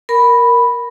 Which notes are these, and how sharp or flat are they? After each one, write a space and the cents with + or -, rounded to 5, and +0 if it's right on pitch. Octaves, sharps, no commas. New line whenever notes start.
A#4 +0 B5 +0